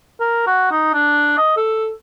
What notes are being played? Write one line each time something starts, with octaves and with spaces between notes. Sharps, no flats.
A#4
F#4
D#4
D4
D#5
A4